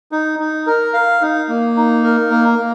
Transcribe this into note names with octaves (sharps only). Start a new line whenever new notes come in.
D#4
D#4
A#4
F5
D#4
A#3
D#4
A#4
A#3
A#3